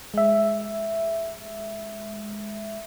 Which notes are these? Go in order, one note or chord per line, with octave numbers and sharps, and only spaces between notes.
G#3 E5